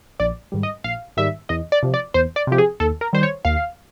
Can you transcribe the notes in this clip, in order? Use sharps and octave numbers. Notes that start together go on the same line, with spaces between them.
A#1 D5
G#2 D#3 G3
D#5
A#1 F5
G#2 D#3 G3 E5
E2 D#5
D5
C3 F3
D5
E2 C5
D5
C3 F3 G4
G#4
D#2 A4
A#4
D#3 G3 C5
C#5
D#2 F5